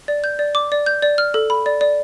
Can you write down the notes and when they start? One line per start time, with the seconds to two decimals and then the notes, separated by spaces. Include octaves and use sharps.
0.08 D5
0.24 G6
0.39 D5
0.55 D6
0.72 D5
0.86 G6
1.02 D5
1.18 F6
1.34 A4
1.50 B5
1.66 D5
1.81 D5